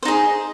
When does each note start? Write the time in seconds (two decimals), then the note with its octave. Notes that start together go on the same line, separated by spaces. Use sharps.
0.03 C5
0.05 D#4
0.08 G#4